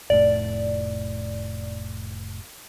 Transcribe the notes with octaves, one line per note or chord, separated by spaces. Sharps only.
F1 A2 D5